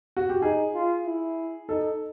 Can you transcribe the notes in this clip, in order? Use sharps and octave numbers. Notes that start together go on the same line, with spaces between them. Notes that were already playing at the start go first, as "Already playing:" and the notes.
F#4
G4
D#4 G#4
F4
E4
D#4 A4